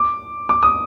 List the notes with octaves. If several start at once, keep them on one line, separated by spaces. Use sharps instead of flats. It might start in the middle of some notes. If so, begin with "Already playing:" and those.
Already playing: D6
D6
D#6